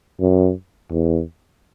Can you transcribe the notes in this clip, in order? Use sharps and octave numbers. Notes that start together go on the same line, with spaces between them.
F#2
E2